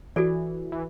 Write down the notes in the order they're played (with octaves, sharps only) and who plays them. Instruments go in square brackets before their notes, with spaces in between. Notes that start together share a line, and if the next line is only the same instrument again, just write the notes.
[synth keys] E3 [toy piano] F#4 A4 D5
[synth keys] E3